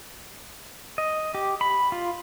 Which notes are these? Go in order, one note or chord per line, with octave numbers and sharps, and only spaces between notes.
D#5
G4
B5
F4